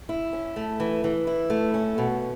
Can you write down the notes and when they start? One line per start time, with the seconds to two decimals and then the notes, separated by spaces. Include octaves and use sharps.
0.09 E4
0.33 C#4
0.56 A3
0.80 E3
1.04 E3
1.27 E4
1.50 A3
1.74 C#4
1.98 B2